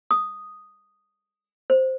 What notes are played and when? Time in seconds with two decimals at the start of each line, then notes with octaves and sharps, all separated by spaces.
0.11 D#6
1.70 C5